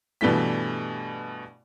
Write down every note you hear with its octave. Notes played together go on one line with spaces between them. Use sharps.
G2 B2 E3 G3 A3 B6